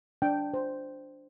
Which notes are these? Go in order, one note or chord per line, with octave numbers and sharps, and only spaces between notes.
D4 G5
C5